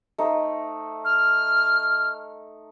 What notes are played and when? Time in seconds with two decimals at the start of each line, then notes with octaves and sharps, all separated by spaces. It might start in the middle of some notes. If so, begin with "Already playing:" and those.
0.18 A3 D#4 C5
1.05 F6